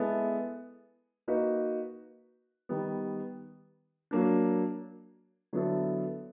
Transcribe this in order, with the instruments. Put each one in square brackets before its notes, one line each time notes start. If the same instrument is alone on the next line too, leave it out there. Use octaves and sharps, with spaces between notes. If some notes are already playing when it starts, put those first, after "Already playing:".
Already playing: [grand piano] G#3 B3 E4 A4
A#3 D#4 F#4 B4
D#3 G3 B3
F#3 A#3 D4
D3 F#3 B3 E4 A4